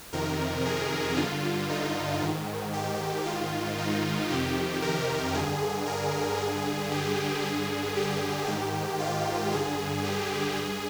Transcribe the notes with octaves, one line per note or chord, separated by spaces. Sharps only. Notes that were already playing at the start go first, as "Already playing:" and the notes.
F2 C3 D#3 A#4
G#4
G2 D3 F4
D#4
G#2 D#3
G4
G#2 D#3 F4
D#4
F2 C3 D#3 G4
A#4
G2 D3 G#4
A#4
G2 D3 G#4
G4
G2 D3 G#4
G4
G#2 D#3 G4
F4
G2 D3 G#4
G4
G2 G#4